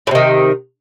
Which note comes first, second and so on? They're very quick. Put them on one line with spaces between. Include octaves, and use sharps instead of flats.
A2 C3 D#3